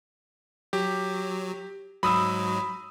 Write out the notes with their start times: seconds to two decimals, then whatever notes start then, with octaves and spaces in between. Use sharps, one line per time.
0.73 F#3 G4
2.03 G#2 F#3 B5 D#6 E6